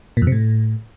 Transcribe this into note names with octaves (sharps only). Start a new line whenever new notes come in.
A#2
F2
C3
A2